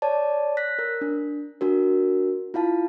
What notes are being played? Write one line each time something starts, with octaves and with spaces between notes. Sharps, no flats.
C#5 D5 A5
F#6 A#6 B6
A#4
D4
D4 F#4 A#4
E4 F4 F5 A5